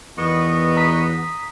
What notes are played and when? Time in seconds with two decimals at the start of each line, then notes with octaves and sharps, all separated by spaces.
0.18 E2 B2 D#3 B3 D#5 C#6
0.77 A#5 D#6 B6